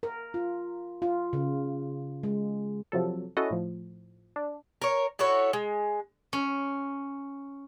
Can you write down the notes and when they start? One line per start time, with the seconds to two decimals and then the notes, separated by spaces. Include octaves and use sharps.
0.03 A#4
0.34 F4
1.02 F4
1.33 C#3
2.23 G#3
2.92 C3 F3 F#3 A4
3.37 C#4 E4 F#4 A4 D#5
3.51 A2 F3
4.36 D4
4.82 A#4 C#5
5.19 E4 F#4 A4 C#5
5.53 G#3
6.33 C#4